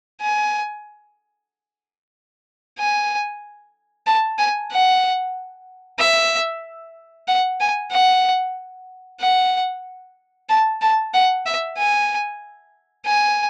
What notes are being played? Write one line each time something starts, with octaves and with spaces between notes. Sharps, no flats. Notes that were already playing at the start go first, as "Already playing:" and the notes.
G#5
G#5
A5
G#5
F#5
E5
F#5
G#5
F#5
F#5
A5
A5
F#5
E5
G#5
G#5